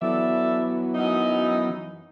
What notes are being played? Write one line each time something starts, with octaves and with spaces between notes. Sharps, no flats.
E3 F#3 B3 A4 D5 E5
F#2 D#4